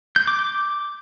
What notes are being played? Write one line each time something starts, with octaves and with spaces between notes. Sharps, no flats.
G6
D6
D6